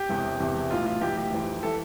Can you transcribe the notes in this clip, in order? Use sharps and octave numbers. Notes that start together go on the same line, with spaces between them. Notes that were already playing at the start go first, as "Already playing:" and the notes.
Already playing: G4
E1 E2 C3 E3
E1 E2 C3 E3
B1 A2 E3 F4
F4
B1 A2 E3 G4
G4
F1 F2 E3
E3 A4